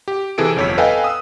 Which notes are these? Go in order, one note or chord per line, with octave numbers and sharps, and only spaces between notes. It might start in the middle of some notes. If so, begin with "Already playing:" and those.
G4
C3 E3 G#4 A4 D7
G1 F2 C#5 E6 B6
A4 B4 D#5 F5 G5 G#5
D#6 E6